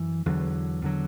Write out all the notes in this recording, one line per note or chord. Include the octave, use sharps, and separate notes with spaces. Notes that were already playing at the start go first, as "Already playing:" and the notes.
Already playing: F#2 E3
E2 D3 F#3
E2 D3 F#3